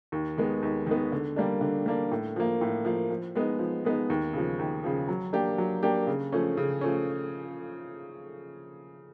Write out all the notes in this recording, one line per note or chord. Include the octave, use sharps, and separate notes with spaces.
D#2
D#3 G#3 B3
D#2
D#3 G#3 B3
D3
G3 A#3 D4
D3
G3 A#3 D4
A2
F3 A#3
A2
F3 A#3
F3
G#3 B3 D#4
F3
G#3 B3 D#4
D#2
C#3 F3
D#2
C#3 F3
F#3
A#3 D4 G4
F#3
A#3 D4 G4
C#3
F3 A3 C#4
C#3
F3 A3 C#4